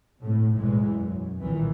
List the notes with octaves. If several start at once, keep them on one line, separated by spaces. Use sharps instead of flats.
A2 C3
B1 E2 G#2 E3 G#3
F#2
C2 A#2 D#3 E3